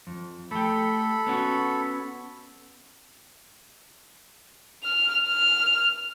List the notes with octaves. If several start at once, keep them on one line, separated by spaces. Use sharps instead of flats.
F2
A3 G4 A4 B5
B3 C#4 F#4
F6
F6